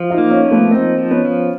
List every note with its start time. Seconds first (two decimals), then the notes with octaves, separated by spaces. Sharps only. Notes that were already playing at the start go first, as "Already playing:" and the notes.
Already playing: F3
0.10 D#4 F4
0.18 A#3
0.31 C#4 D#4
0.44 F3
0.51 A3 B3
0.71 A#3 C4 D#4
0.98 F3
1.11 B3 C#4
1.25 F3